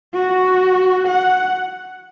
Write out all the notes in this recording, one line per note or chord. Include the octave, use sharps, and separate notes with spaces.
F#4
F#5